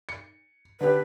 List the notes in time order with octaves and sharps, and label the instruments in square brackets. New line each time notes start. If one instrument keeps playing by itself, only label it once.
[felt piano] C#7
[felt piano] D3 B3 G4 [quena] B4